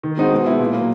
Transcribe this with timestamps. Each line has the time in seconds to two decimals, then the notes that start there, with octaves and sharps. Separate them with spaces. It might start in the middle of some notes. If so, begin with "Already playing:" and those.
0.03 D#3
0.17 G#3 C4 D#4 F#4
0.32 B2
0.46 G#3 B3 E4
0.59 A#2
0.74 F#3 A#3